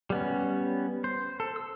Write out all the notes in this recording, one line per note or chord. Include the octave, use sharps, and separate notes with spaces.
G3 B3 C#4
C5
A4
E6